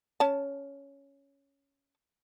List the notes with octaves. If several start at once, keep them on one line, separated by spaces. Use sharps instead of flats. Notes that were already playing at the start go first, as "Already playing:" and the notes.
C#4 A5